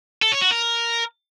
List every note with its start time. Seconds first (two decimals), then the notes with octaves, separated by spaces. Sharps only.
0.22 A4
0.32 C#5
0.41 F#4
0.51 A#4